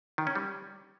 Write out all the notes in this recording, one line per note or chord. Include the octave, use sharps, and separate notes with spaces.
D#3
C#4
G3